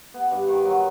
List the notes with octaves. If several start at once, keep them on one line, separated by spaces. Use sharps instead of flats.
B3
G2
D#3
F#3